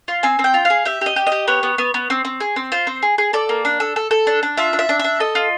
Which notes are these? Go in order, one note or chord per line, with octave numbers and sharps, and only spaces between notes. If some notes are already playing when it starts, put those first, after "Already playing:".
F4
C4 G#5
C4
G5
F4
F5
G#4
G4 E5
G4 D#5
G4
D#5
G4
B3 C#5
B3
B3
B3
C4
C4
G#4
C4
F4 C5
C4
G#4
G#4
A4 D5
A#3
D4
A4
A4
A4
D4
D4
F4 E5
D4
E5
D4
D4 E5
A4 D#5
F4